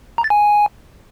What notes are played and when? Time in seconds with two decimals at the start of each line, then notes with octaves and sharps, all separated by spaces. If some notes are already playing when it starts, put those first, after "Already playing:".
0.18 A#5
0.24 A6
0.30 G#5